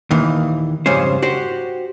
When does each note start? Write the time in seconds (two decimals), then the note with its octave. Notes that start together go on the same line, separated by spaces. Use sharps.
0.11 D#2 A#2 D#3 E3
0.86 F2 G#2 C#3 G3 C#4 C5
1.22 F#4 G4 C5